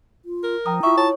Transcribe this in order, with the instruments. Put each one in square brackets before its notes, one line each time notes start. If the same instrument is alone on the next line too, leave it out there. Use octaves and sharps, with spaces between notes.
[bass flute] F4
[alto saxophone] A#4
[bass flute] F3 [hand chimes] G5 A#5 D#6
[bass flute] E4 [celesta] F4 C#6 [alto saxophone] E5
[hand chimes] C#5 [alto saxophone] A5